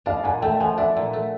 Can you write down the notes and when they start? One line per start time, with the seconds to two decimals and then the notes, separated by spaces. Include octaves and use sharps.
0.06 D4 D#5 F5
0.24 A#2 F#5 G#5
0.42 A3 G5 A5
0.60 F3 F#5 G#5
0.78 D4 E5 F#5
0.97 A#2
1.13 A3